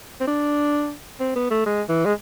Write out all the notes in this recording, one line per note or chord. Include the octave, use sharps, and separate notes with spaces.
C4
D4
C4
B3
A3
G#3
E3
G#3